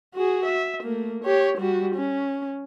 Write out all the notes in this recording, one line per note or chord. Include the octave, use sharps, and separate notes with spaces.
F#4 G#4
E5
A3 A#3
G4 C#5
G3 F#4
C#4